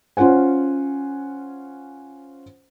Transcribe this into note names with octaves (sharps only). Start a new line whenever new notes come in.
C#4 F4 C5 F#5 G#5